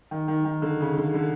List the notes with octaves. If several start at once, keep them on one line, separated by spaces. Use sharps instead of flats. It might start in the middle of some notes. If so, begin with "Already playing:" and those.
D#3
D#3
D#3
D3
C#3
D3
D3